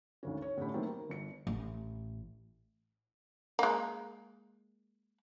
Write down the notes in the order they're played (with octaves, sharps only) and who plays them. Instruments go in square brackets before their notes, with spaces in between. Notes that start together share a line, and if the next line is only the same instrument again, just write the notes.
[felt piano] G#1 D2 C#4
C#5
A2 D3 A3 C#4 G4 B5
D3 D#3 F#3 A3 A#3 C4
A#4
G1 C#7
[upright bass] A1
[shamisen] G#3 A#3